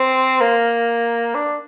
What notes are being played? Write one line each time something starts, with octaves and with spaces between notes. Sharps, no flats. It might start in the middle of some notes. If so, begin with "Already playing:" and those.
Already playing: C4
A#3
D4